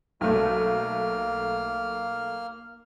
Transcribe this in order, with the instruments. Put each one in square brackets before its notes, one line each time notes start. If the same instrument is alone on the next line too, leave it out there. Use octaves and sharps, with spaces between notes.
[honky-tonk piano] B1 A3 [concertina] A#3 F6